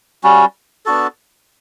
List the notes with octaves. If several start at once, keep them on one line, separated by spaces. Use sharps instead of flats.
G3 C#4 F#4
B3 D4 F#4 A4